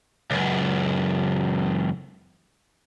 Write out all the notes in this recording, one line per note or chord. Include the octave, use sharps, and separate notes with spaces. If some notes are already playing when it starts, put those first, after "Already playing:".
C#2 F#2